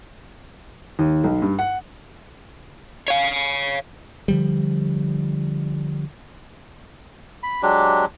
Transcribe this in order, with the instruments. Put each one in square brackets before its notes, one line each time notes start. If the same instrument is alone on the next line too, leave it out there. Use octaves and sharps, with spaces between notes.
[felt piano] D#2
B1
G2
F#5
[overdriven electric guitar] C#5 F5
[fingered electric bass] D3 F3 G3
[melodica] B5
F#3 G#3 D4 G4